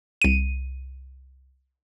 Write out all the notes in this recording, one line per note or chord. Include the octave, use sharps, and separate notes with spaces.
C2 D#7